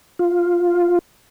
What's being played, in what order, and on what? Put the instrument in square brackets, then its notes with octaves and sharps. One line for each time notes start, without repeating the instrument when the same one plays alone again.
[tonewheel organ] F4